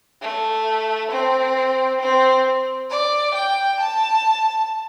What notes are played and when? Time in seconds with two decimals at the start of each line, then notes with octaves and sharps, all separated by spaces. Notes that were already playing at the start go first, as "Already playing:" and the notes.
0.22 A3
1.11 C4
2.01 C4
2.90 D5
3.34 G5
3.80 A5